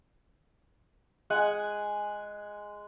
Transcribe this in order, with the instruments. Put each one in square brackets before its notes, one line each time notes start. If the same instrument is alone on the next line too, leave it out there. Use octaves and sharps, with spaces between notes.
[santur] G#3 F#5 G#5